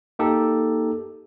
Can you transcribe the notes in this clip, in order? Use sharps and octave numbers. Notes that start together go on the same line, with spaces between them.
A#3 D#4 G4 A4